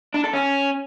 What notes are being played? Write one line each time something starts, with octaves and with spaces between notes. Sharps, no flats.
D4
A4
C#4